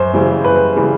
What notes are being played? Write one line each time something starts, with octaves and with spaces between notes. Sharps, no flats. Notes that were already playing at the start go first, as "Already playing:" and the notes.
Already playing: F#2 C5
C#3 E3 G3
F#2 B4
C#3 E3 G3